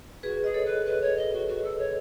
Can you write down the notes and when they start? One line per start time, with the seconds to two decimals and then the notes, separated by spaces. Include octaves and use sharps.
0.23 F#4 G#4 B4
0.44 G#4 D#5
0.54 A4 C#5
0.65 B4
0.86 B4
1.01 C#5
1.17 D#5
1.32 F#4
1.48 F#4
1.64 A4
1.79 C#5